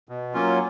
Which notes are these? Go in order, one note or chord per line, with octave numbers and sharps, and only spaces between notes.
B2
F#3 A#3 C#4 F4